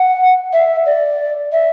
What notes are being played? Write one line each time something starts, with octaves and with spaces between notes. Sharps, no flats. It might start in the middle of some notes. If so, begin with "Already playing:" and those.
Already playing: F#5
E5
D5
E5